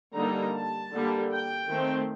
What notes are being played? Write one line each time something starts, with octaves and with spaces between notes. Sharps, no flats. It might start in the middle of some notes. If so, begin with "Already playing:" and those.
D3 G3 A#3 D#4 A#5
A5
D3 G3 A#3
G5
D#3 A3 C4